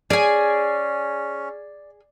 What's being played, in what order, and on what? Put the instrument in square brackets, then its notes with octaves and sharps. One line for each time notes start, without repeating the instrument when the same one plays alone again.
[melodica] C#4 [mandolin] G#4 G#5 [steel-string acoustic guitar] D5